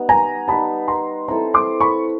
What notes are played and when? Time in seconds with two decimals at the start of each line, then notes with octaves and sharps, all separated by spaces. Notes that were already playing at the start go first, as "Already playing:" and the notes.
Already playing: G3 B3 D#4
0.09 G#5 A#5
0.48 G3 B3 D#4 A5 B5
0.88 A#5 C6
1.28 C4 E4 A4 C5 A#5 C6
1.54 C6 D6
1.80 B5 C#6